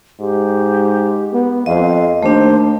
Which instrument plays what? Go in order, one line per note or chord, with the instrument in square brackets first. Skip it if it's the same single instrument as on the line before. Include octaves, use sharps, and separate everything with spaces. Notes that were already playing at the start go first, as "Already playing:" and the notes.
[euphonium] G#2 [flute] G4
[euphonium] B3
[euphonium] F2 [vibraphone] D#5 [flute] F5
[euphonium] D#2 [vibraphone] A3 D4 [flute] C5